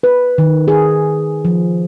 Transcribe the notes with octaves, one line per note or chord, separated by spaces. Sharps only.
B4
D#3
G#4
F3